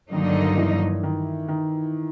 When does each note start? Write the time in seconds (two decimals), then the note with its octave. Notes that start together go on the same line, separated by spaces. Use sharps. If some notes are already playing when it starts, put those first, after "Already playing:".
0.12 G2 D3 D#3 F#3 A#3 D#4
0.58 E3
1.03 D#3
1.48 D#3